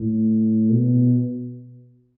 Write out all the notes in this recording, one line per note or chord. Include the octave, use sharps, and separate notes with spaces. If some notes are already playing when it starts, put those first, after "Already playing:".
Already playing: A2
B2